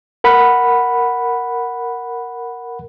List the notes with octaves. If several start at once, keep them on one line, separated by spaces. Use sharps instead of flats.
A#4 F#5 B5